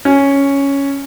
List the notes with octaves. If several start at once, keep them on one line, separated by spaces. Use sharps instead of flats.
C#4